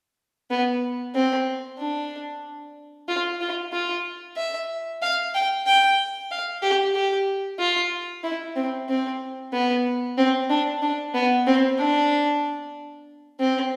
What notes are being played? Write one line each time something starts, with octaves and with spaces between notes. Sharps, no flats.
B3
C4
D4
F4
F4
F4
E5
F5
G5
G5
F5
G4
G4
F4
E4
C4
C4
B3
C4
D4
D4
B3
C4
D4
C4